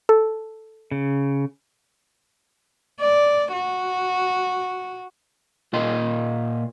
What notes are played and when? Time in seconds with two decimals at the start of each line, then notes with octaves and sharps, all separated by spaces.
0.09 A4
0.91 C#3
3.00 D5
3.53 F#4
5.73 A#2 F4 A#4 D#5 C6